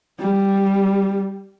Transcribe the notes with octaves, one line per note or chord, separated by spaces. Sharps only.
G3